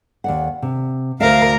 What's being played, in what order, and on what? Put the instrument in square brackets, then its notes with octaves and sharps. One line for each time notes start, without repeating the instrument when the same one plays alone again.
[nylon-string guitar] D#2 D5 F#5
C3
[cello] D2 A#4 [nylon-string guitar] C5 E5 [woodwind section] F5